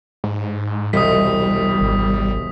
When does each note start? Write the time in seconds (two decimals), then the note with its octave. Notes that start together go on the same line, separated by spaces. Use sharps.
0.24 G#2
0.93 E1 C2 G3 D#5 D#6 B6
1.81 G#1